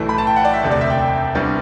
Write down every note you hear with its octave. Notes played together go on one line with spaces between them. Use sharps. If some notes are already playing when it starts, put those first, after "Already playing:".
Already playing: B1 A2 E3 A3
B5
A5
G5
F#5
D5
E5
E1 D2 C3
D5
E5
G5
C2 C3 G3 B3 D4